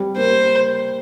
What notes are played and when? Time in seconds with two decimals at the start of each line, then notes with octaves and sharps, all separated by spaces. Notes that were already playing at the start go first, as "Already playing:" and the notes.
Already playing: G3 C4
0.17 A#3 C5